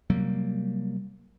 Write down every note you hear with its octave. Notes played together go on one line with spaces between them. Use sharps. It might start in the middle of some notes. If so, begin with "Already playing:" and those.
C3 F#3 G3 A#3